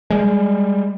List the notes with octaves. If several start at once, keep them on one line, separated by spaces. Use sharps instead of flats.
G3 G#3